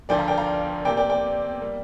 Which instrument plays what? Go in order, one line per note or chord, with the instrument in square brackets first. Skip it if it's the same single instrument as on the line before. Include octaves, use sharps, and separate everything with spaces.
[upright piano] D2 D3 F3 [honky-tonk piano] D5 G5
[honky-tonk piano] F5 A#5
D5 G5
F5 A#5
[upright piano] C3 A#3 G4 [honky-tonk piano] D5 G5
[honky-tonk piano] D5 G5
D5 G5
[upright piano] G3 A#3